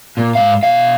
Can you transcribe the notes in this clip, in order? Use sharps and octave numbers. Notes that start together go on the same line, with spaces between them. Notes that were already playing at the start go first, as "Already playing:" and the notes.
A#2
G#2 F5
B2 F5